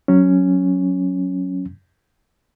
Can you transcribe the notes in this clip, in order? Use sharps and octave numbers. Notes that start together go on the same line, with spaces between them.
F#3 C#4